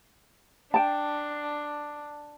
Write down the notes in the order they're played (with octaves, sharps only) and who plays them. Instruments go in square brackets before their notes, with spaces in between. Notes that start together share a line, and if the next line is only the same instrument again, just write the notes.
[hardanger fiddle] D4 [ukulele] G5 A5